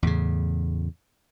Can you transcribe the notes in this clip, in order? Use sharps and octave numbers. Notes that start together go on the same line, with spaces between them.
E2 A2 C#3